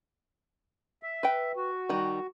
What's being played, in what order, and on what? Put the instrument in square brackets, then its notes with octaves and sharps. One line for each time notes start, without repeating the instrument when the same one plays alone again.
[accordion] E5
[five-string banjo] B4 G5
[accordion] F#4
[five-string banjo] D#3 G3